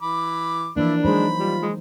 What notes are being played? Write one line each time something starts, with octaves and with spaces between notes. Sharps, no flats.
E3 B5 D6
E3 F3 A#3 D4 E4 D5
F#3 G#3 D#4 C5 B5
G3 F4
G#3